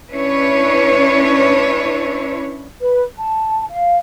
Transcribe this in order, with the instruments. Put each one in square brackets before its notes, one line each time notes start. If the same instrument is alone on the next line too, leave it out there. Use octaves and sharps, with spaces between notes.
[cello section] C#4 D4 E4 B4 C#5
[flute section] B4
A5
F5